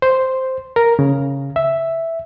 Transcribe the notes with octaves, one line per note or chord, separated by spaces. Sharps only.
C5
A#4
C#3
E5